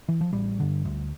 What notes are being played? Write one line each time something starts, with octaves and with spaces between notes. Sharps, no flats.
E3
F3
A1 G3
G2 D3
D2